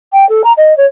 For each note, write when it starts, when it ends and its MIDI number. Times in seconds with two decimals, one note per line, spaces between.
0.13 0.27 79
0.29 0.42 69
0.44 0.52 82
0.57 0.75 75
0.77 0.86 73